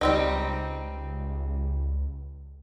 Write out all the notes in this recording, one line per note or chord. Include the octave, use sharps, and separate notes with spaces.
C#2 G3 C4 D#4